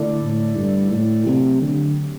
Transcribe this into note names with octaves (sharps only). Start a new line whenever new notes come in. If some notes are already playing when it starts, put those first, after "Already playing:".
Already playing: D3 A3 E4 A4 D5
A2
G2
A2
C3 F#3 A3 C4 G4
D3